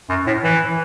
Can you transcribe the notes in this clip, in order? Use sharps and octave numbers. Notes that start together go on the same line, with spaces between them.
F#2
A2
E3